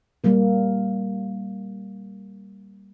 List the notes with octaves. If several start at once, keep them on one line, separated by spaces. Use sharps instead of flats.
G3 A#3 A4